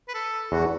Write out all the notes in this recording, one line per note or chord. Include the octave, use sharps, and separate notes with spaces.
B4
A4
E2 F#4